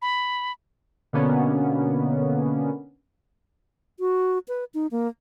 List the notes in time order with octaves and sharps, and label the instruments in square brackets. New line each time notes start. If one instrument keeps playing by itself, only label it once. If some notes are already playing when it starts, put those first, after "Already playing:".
[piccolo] B5
[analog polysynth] B2 D3 A#3 B3 C#4
[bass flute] F#4
B4
D#4
A#3